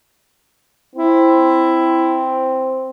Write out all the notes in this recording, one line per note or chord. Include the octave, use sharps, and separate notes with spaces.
C4 E4